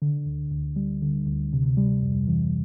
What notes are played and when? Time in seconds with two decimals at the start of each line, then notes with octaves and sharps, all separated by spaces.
0.02 D3
0.26 D2
0.51 D2
0.76 G3
1.02 D3
1.27 D2
1.53 C3
1.77 G3
2.03 F2
2.28 E3